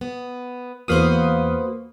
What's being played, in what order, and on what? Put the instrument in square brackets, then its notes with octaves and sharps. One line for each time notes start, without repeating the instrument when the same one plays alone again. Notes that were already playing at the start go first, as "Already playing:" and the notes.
[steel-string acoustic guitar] B3
[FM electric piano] E2 F5 D#6 [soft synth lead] A#3 [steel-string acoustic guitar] F#4 B4 C5